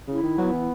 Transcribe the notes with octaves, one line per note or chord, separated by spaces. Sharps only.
C#3 E4
D#3
F#3 B3
E3